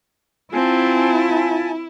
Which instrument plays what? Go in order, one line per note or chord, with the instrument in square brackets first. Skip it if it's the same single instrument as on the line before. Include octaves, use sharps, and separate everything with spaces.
[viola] C4 [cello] E4 [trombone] F4 [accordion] G#5 A5